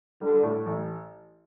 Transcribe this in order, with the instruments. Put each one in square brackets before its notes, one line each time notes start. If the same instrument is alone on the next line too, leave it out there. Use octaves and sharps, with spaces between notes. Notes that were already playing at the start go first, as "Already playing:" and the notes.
[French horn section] D3 [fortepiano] G3
[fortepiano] A2
A1